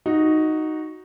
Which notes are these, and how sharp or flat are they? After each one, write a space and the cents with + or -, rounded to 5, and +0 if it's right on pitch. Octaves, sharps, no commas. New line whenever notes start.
D#4 +0 F#4 +0